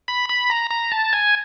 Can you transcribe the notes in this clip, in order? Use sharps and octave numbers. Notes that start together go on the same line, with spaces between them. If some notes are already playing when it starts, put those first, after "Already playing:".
B5
B5
A#5
A#5
A5
G#5